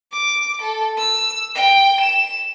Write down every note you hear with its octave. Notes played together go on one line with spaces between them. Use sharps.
D6
A4
E6
G5
E7